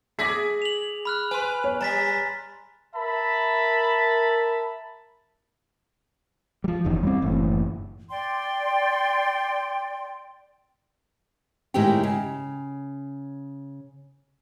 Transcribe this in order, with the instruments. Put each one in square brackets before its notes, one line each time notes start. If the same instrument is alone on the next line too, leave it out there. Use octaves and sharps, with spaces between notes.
[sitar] G#4 [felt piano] D6 A#6 B6
[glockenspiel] F7 F#7
B5 F6 F#6
[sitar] B4 [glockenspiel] G#5 C6
[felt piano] C#5
[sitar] G3 [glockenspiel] A#5 A6 B6
[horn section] A#4 E5 A5 B5
[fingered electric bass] F3 G3
F#1 E2 D#3
G3 G#3 C4
F#1 A2 E3
[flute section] D5 G5 C6
[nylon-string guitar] A2 D#3 G#3 E4 G4 G5
C#3